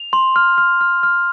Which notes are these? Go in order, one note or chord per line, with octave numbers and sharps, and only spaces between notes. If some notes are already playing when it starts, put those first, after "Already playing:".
Already playing: F7
C6
F6
F6
F6
F6